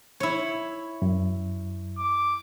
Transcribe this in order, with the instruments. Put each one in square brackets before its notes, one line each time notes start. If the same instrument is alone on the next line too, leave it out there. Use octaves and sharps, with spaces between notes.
[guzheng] E4 C#5
[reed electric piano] F#2
[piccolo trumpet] D6